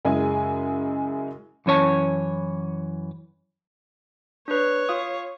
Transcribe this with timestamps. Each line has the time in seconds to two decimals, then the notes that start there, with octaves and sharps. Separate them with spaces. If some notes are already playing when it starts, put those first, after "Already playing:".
0.05 F#2 C#3 G#3 E4 G#4 G#5
1.66 F#2 E3 C#4 C#5 A5
4.48 D4 B4 C#5
4.89 F4 F5 D#6